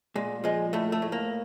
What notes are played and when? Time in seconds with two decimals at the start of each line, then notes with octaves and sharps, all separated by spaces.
0.16 A#2 G#3
0.44 F3 G#3
0.73 A2 A3
0.92 A3
1.02 A2
1.12 A#3